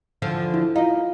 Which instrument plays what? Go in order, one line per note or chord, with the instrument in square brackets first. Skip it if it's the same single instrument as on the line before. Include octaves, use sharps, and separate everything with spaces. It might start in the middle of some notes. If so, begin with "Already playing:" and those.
[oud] E2 D3 F3
[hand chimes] E4
[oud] A#3 D#4 [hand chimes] F4 F5